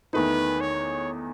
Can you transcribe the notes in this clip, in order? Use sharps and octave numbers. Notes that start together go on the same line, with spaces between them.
E2 D#3 A3 D#4 B4
C#5